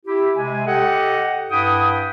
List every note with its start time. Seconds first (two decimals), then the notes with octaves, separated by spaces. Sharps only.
0.05 E4 G4
0.35 C3 G#3 G#5
0.65 G4 A4 D#5 F#5
1.50 G2 D4 E4 F#5 G5 D#6